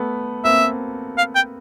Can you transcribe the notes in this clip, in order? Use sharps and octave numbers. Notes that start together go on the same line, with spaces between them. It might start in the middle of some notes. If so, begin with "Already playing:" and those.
Already playing: A3 B3
A#3 C4 E5
F5
G5